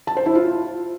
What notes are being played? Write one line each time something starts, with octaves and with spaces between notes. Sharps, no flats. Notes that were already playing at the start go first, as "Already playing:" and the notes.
A5
C5
E4
F4